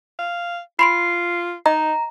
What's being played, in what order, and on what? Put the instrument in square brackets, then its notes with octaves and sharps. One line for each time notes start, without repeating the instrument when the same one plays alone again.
[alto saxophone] F5
[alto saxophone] F4 [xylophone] B5 C6 D7 [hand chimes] C7
[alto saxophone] D#4 [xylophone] D#5 [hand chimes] A#5